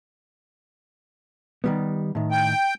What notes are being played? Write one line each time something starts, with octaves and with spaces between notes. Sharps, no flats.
D#3 G3 B3
A2 D#3
G5